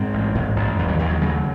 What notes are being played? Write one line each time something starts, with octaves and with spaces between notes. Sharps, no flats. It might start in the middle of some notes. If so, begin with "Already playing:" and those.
Already playing: G#2 G#3 C4
A1
G#2
A1
D#2
D#3 F#3
D#2 E3
D#3 F#3
C#3 F#3 A3